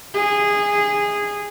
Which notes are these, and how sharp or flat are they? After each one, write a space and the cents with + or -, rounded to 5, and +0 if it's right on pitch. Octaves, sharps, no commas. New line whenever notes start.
G#4 -15